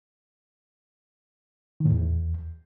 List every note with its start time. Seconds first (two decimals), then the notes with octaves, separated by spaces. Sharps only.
1.80 D#3
1.85 A2
1.91 E2